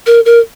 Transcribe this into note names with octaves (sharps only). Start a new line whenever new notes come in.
A#4
A#4